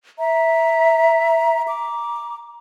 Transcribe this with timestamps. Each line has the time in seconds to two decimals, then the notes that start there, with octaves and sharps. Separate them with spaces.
0.19 E5 A#5
1.69 A#5 D6